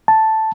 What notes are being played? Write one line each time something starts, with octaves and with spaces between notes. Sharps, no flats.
A5